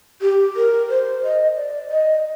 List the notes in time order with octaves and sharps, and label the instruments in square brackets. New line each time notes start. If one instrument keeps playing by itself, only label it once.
[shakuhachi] G4
A#4
C5
D#5
D5
D#5